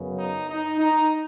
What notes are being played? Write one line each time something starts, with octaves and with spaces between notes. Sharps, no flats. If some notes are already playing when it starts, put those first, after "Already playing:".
Already playing: F#2 C#3 B3
D#4
D#4
D#4